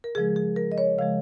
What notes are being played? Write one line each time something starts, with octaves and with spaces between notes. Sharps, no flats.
A#4
C#3 F3 G#3 G#4
G#4
A#4
D#5
C#5
C#3 F3 G#3 F5